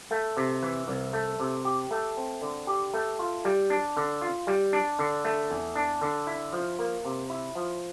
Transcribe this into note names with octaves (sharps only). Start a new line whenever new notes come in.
A3
C3
E3
C2
A3
C3
G4
A3
C4
D3
G4
A3
F4
G3
D4
D3
F4
G3
D4
D3
A3
E2
D4
D3
E4
F3
A#3
C3
E4
F3